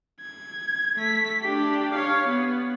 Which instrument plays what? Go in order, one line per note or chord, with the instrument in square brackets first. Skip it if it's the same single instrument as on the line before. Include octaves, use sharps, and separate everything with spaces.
[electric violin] G#6
A3 B6
D4 G4
C#5 F5
B3